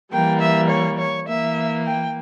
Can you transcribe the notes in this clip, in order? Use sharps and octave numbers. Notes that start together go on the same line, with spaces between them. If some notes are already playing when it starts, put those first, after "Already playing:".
E3 G3 A#3 G5
E5
C#5
C#5
E3 A#3 E5
G5